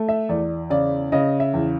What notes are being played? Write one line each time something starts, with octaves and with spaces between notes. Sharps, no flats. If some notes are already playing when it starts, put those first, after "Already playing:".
Already playing: A3
E5
E2 D5
C#3 D5
C#3 D#5
E5
E2